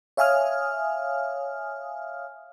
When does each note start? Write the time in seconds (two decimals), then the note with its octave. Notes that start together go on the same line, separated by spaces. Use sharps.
0.17 C#5 E5 F5 G#5 D#6 F6